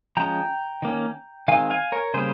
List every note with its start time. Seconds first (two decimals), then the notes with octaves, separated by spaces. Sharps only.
0.17 F3 G#3 C#4 G5 A#5
0.82 D#3 A#3 C#4
1.48 D#3 G#3 C4 F5 G#5
1.70 F5 G#5
1.92 A#4 C#5
2.14 C#3 G3 A#3 C#4 G#4 C5